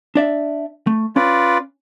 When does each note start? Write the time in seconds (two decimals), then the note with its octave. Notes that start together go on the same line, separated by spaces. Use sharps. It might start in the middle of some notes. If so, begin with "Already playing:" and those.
0.15 D4 D5 E5
0.87 A3
1.16 C#4 F4 B4 D5